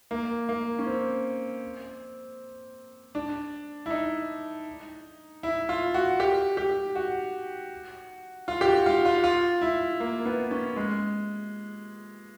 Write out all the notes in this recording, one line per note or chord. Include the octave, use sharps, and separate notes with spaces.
A#3
A#3
C#4
C4
D4
E4
D#4
E4
F4
F#4
G4
G4
F#4
F4
G4
F#4
F4
F4
F4
E4
A#3
B3
C#4
G#3